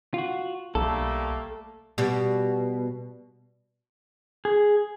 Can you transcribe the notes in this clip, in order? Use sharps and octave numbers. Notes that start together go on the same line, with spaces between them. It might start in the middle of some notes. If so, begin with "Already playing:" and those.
F4 F#4
B1 G3 A3 A#3 A4
B2 G3
G#4